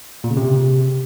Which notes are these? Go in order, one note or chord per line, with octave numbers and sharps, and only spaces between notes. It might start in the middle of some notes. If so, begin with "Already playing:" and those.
A#2
C#3
C3